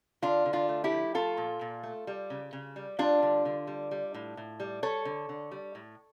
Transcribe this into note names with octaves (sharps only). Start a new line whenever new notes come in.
D3 D4 F4
D3
D4 F4
A3
E4 G4
F3
A3 F4 A4
A#2
A#2
A3
G3
C#3
C#3
G3
G3 D4 F4
D3
D3
G3
G3
A2
A2
G3
G3 A4 C#5
D3
D3
G3
A2